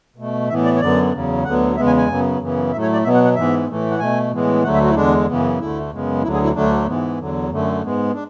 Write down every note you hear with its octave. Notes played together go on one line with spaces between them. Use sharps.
B2 A3
A2 E3 B3 E5
D5
C#5
F#2 D3 F#3 B3 D5
E2 C#3 F#3
D2 D3 F#3 B3 F#5
E2 C#3 G#3 B3 E5
G#5
G#5
F#2 C#3 F#3 B3
F#2 C#3 E3 B3
A2 F#3 A3 E5
C#5
D5
B2 F#3 B3 E5
F#5
F#5
G#2 E3 B3 E5
A2 E3 A3
F#5
B2 A3 G#5
A2 E3 G#3 B3
D2 D3 F#3 A3 F#5
E5
F#4
E4
E2 D3 G#3 D4
F#2 C#3 E3 B3
D2 D3 A3 E4
F#2 C#3 G#3 B3
D2 D3 F#3 E4
G#4
E4
D2 D3 F#3 A3 D4
G#2 E3 B3
E2 D3 F#3
F#2 D3 A3
G#2 G#3 B3
D4